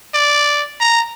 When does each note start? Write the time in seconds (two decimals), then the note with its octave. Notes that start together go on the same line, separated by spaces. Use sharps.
0.14 D5
0.80 A#5